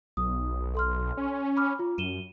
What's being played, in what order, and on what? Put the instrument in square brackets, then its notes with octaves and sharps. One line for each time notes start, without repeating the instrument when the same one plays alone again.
[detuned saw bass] B1 [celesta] D#6
[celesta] A4 C6 F6
[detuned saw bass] C#4
[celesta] B5 D6 F6
F4
[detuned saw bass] F#2 [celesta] D#7 E7 G7